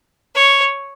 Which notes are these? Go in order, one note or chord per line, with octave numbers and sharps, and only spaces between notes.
C#5